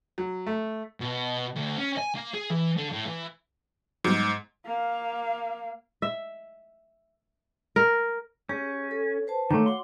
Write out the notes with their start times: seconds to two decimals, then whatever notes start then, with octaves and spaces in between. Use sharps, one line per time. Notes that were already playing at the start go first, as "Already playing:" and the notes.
0.18 F#3
0.47 A3
1.00 B2
1.56 D2
1.78 C#4
1.99 G#5
2.16 A#3
2.34 G#4
2.50 E3
2.77 D3
2.92 A2
3.06 E3
4.04 G#2 F#3 G3 B3
4.65 A#3 F5
6.02 E5
7.76 A#4
8.49 C#4 G4 G#4
8.91 A4 C#5
9.27 B4 C5 A5
9.51 D#3 A3 C#5 F5 D6
9.66 F#4 F#5 C6 D6